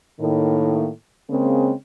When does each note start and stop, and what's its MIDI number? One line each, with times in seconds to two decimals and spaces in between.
0.20 0.89 45
0.20 0.89 51
0.20 0.89 58
1.29 1.72 49
1.29 1.72 56
1.29 1.72 58
1.29 1.72 60